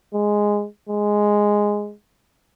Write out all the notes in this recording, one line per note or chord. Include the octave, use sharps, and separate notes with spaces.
G#3
G#3